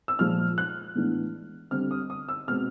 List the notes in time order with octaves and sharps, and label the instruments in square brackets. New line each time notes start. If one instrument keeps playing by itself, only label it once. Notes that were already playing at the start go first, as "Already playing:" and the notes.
[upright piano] E6
A#2 F3 G#3 F6
F#6
A2 E3 G#3 B3 D4
D3 G3 C4 F6
D#6
D#6
E6
B2 G#3 C4 F6